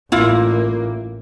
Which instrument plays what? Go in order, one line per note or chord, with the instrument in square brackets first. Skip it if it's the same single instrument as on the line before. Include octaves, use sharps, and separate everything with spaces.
[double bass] A1 A#3 [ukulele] E4 F4